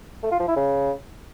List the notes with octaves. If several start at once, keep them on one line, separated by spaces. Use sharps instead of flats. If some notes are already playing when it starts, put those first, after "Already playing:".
A3
F4
F3
E4
C#3